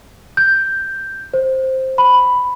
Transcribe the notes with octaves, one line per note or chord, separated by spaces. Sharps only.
G6
C5
B5